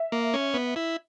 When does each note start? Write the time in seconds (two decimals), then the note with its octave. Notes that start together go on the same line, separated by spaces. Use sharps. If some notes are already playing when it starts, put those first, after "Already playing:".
Already playing: E5
0.12 A#3
0.34 C#4
0.54 B3
0.76 E4